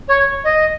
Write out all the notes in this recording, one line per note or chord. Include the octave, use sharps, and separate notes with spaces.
C#5
D#5